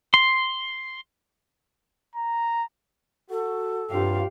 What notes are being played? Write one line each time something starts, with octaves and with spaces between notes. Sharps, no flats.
C6
A#5
F#4 A4
G2 C3 F#3 F4 G4 F5